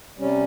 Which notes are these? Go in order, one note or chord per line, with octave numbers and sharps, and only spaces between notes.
C3 G3 C#4